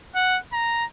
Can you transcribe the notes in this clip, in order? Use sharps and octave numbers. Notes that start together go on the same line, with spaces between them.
F#5
A#5